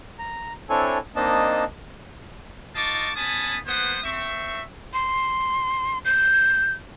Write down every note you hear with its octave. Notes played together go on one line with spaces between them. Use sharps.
A#5
C4 D4 E4 A4 C#5 G#5
A#3 C4 D4 D#4 D#5 A5
D#4 F4 D#5 A5 C#6 D6
B3 C#4 G#5 A5 B5 D#6
A#3 B3 B4 C5 F#5 D#6
C4 E5 C#6
C6
G6